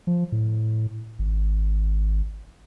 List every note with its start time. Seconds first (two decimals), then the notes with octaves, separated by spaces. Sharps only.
0.07 F3
0.32 A2
1.19 G#1